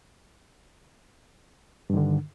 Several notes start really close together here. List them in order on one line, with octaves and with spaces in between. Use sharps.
G2 D#3 D3